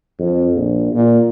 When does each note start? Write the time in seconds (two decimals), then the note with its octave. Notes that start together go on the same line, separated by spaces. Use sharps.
0.19 F2
0.55 A#1
0.93 A#2